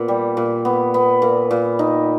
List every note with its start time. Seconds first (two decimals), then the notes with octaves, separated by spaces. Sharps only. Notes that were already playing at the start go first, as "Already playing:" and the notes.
Already playing: A#2 B3
0.08 G3
0.37 A#2
0.65 B3
0.94 B3
1.22 A#2
1.51 A#2
1.79 D#4